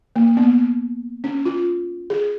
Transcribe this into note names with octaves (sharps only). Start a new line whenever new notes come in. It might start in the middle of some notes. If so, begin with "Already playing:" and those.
A#3
B3
C#4
F4
G#4